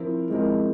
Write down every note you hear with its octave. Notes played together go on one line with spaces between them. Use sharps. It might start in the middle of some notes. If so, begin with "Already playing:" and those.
Already playing: F3 C4 E4 A#4
F3 G#3 C4 E4 A#4